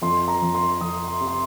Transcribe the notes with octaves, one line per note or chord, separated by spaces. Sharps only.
F2 C6
A#5
F2
C6
F2 D#6
C6
C3
C6